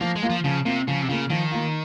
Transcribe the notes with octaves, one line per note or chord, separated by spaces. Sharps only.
F3 A#3
G#3
A#3 F4
F3
C#3 F3
C3 A#3 F4
C#3 F3
C3
C#3 A#3 F4
D#3 F3
A#3 F4